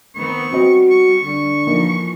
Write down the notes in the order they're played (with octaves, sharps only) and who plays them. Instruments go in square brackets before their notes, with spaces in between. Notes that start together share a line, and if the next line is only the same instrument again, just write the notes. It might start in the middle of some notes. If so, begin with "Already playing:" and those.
[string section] D#3 B3 C4 [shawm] C#6
[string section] G3 [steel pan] B3 C4 D#5 [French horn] F#4
[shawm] C#6
[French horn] D3 [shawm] C#6
[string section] E3 F3 [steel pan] A#3 D#4